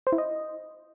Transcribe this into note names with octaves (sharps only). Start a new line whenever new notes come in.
C5
E4
D#5